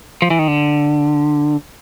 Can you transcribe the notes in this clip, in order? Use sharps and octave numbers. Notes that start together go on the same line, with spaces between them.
F3
E3
D#3
D3